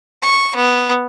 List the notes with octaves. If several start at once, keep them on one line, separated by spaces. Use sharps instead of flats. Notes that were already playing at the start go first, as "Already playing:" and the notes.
C#6
B3